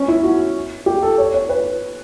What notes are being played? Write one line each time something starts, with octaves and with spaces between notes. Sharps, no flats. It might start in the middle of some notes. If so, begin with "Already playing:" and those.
Already playing: C#4
E4
F#4
G4
A4
C#5
C#5
B4